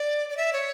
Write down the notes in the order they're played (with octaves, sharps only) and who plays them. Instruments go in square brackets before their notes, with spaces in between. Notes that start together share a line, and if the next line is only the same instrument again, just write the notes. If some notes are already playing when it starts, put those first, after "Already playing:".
Already playing: [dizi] D5
D5
E5
C#5